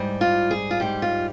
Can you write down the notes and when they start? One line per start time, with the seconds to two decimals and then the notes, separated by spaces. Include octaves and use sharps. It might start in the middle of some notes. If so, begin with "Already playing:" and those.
Already playing: G#2 G3
0.21 F4
0.51 G#4
0.71 F4
0.80 G#2 G3 G4
1.02 F4